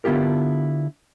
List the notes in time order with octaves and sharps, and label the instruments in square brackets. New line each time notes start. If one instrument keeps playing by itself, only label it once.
[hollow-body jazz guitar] D3 B3 E4 F4 G4 A#4